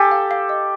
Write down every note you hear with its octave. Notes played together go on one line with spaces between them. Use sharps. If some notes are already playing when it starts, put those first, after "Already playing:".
Already playing: G4 A4 G#5
F5
F5
D#5